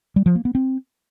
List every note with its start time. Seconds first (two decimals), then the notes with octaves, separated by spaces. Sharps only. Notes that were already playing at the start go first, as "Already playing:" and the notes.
0.16 G3
0.26 F3
0.35 A#3
0.45 B3
0.55 C4